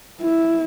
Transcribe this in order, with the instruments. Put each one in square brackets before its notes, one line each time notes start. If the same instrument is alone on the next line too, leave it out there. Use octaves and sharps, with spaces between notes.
[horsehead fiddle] E4